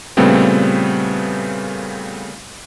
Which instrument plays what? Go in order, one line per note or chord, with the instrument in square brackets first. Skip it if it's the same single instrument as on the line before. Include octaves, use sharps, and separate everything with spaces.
[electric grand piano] A#2 C#3 G3 A3 B3 C4